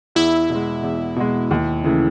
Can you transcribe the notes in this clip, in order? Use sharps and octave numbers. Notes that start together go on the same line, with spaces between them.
E2 E4
B2 G#3
E2
B2 G#3
D#2
C#3 E3 A3